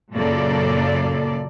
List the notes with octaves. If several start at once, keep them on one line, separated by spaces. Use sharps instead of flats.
F#2 A#2 C#3 A#3 A4 D5